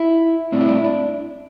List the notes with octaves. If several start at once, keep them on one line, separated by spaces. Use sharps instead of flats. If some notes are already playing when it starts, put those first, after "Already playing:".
Already playing: E4
A2 G3 C4 D4
E4
D4
E4
D4